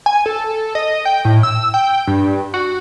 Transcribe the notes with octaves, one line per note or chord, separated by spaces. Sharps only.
G#5
A4
D#5
G5
A2
E6
G5
G2
F#4